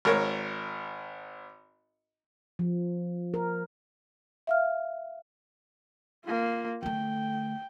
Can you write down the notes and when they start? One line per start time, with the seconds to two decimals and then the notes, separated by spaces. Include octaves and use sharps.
0.05 G#1 A#4 C#5
2.59 F3
3.34 A#4
4.47 E5 F5 F6
6.25 A#3 F4
6.83 D3 A3 G5